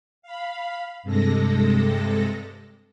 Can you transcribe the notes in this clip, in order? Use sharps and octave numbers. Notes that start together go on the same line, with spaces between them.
F5 B5
G2 C3 G#3 A4 A#6